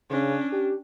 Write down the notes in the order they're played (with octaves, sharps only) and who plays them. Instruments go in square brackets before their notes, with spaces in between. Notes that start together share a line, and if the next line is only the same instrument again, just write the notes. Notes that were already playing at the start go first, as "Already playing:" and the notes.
[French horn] C#3 [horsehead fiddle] C#4 D4
[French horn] G4